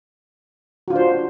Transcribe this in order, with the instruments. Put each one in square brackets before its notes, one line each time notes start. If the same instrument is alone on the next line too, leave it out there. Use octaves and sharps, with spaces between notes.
[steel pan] F#4
F4
D4
C5